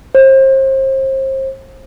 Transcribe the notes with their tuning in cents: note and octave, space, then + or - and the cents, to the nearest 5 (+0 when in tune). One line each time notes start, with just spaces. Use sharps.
C5 +35